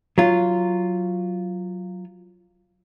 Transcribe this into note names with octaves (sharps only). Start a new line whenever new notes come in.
F#3 F4